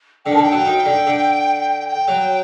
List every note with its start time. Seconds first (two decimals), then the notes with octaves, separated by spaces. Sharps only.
0.25 D3 G5
0.31 D#3
0.34 A5
0.38 D3 G5
0.52 F#3
0.66 D#3
0.86 D3
1.07 D3
1.88 G5
2.08 F#3